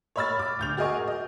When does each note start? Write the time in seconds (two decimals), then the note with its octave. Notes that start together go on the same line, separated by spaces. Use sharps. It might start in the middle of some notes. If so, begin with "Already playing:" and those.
0.16 C#5 D#5 B5 E6 F6 A6
0.39 D6
0.59 D2 G6 F7
0.77 F#4 G#4 A#4 D#5 G#5 C#6
1.08 D#5